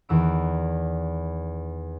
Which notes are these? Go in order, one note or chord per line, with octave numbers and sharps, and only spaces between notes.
E2 D#3 E3 E6 D7